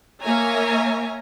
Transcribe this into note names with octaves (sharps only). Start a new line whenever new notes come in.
A#3 A#4 C#5 E5 G#5 A#5